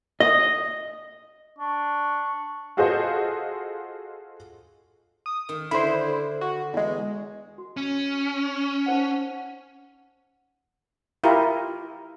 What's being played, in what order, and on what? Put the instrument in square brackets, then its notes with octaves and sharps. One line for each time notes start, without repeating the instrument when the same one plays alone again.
[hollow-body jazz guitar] D#5
[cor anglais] D4 [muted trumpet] C#6
[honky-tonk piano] F4 F#4 G#4 A4 C5 D#5
[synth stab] D#6
[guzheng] D#3
[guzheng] D3 [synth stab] E4 C5
[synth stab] F#4
E2 G#3
[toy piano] F#4
[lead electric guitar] C#4
[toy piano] D#4 C5 F#5
[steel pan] E4 F4 G4 A#4